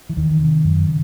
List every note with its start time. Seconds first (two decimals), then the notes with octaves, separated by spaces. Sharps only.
0.09 E3
0.17 E2 D#3
0.41 C3
0.65 F#2
0.88 C#3